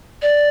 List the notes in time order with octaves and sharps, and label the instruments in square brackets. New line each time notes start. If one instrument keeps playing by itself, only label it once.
[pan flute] D5